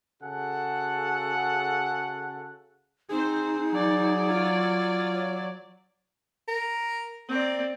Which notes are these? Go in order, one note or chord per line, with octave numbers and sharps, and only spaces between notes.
C#3 F#4 G#4 A4 F#5
C4 D#4 G#4 C5
F#3 D5
F4
C#5
A#4
C4 A#4 D5